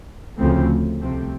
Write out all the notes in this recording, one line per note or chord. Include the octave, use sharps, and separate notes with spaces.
D2 C#3 F3 A3 C4
C2 C3 F3 A3 C4